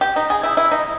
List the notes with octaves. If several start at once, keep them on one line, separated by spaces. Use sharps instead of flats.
G4
D#4
G#4
E4
E4
D#4